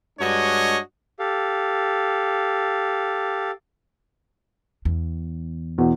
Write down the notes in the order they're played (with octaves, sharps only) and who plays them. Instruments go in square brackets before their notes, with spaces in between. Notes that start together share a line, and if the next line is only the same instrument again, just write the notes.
[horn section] G2 G#3 D4 F#4 C#5 D#5
[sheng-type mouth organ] G4 A4 F5
[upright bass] E2
[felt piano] E2 B2